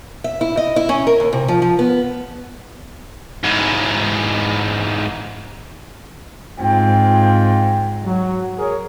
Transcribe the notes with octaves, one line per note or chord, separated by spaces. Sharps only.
E5
E4
D#5
E4
C#4
A#4
D#2
C3
F3
F3
B3
G#2 E3
G#2 C4 F4 G5
F#3
G#4 A#4 C#5